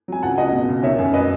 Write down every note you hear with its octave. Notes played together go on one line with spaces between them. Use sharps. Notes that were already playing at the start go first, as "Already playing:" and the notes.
F#3 G#5
C#2 F#5 A5
C#2 D#5 F#5
B2
C#2
D#3 C#5 E5
F#2
B4 D#5